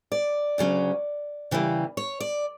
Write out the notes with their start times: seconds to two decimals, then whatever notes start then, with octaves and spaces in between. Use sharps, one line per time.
0.12 D5
0.58 D2 C#3 F#3 C#4
1.51 C#3 E3 G3 A#3
1.97 C#5
2.20 D5